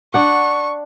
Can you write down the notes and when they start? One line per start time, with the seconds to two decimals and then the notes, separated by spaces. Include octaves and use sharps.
0.14 D4 F#5 C#6